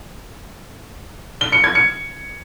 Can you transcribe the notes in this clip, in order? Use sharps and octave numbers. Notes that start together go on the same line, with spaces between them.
G7
C#7
G#6
C#7